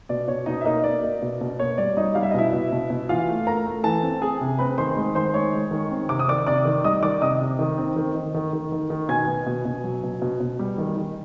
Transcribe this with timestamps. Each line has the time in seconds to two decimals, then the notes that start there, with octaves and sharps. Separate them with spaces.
0.09 B2 D5
0.28 B2 C#5
0.46 B2 D#4 D#5
0.61 E5
0.65 A#3 D#4 D#5
0.84 A#3 D5
1.02 A#3
1.22 B2
1.41 B2
1.59 A#3 C#5
1.78 G3 D5
1.97 G3 D#4 D#5
2.15 G3 F5
2.23 E5
2.31 D#5
2.34 B2 E4 E5
2.53 B2
2.72 B2
2.90 B2
3.09 E3 F4 F5
3.28 A3
3.47 A3 A#4 A#5
3.66 A3
3.84 E3 A4 A5
4.03 C4
4.22 C4 G#4 G#5
4.41 C3
4.59 C4 B4 B5
4.77 D#3 C5 C6
4.97 G#3
5.15 D#3 C5 C6
5.34 G#3 C#5 C#6
5.53 G#3
5.71 D#3
5.91 C4
6.09 C3 D6
6.19 D#6
6.28 D#3 D5 D6
6.47 C3 D5 D6
6.65 D#3
6.84 G3 D#5 D#6
7.03 D#3 D5 D6
7.21 C3 D#5 D#6
7.41 C3
7.59 D#3
7.78 C4
7.96 D#3
8.15 D#3
8.35 D#3
8.53 D#3
8.72 D#3
8.90 D#3
9.08 B2 G#5 G#6
9.27 B3
9.46 B2
9.65 B2
9.84 F#3
10.03 B2
10.22 B2
10.40 B2
10.59 G3
10.78 D#3
10.97 D#3